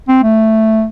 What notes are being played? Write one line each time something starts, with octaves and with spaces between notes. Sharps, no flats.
C4
A3